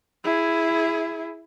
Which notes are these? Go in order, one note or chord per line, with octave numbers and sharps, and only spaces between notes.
E4 G#4